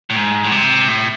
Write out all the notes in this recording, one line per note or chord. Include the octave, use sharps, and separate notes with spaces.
A2
G#2
A2
C3
A2